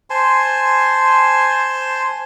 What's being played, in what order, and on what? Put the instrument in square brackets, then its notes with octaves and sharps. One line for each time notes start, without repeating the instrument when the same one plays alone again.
[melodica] C5 G#5 A5 C6